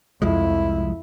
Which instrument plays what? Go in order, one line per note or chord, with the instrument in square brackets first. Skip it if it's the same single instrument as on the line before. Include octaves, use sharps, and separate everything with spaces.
[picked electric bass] C2 F3 G#3 [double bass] F2 E4